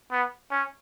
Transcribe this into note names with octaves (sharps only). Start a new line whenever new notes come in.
B3
C#4